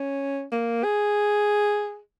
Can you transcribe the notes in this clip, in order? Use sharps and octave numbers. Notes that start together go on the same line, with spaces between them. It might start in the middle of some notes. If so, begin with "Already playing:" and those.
Already playing: C#4
A#3
G#4